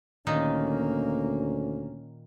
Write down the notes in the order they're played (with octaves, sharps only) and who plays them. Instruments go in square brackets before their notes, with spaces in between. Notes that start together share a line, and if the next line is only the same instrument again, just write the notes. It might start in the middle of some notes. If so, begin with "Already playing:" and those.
[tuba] D2 [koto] A#2 D#3 D#4 [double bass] A#3 [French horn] C#4